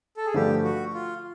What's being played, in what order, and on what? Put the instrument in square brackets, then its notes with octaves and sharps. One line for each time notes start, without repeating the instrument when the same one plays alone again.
[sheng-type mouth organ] A4
G#4
[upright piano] G2 D3 F3 A3 [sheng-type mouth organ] G4
[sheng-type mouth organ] F#4
F4